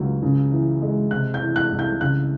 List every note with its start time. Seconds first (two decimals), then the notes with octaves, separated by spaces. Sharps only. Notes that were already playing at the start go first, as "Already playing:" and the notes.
Already playing: C#2 F#3
0.23 C#3
0.52 E3
0.82 G#3
1.11 C3 F#6
1.34 G6
1.42 E3
1.56 F#6
1.72 C2
1.79 G6
2.00 C#3 F#6